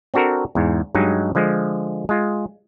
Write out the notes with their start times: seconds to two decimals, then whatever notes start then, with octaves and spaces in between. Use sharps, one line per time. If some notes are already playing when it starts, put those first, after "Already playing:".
0.14 C4 D4 F#4 A4 A#4
0.55 E2 G#2
0.95 G2 F#3 G#3 D#4
1.35 D3 F3 G#3
2.09 G#3 F4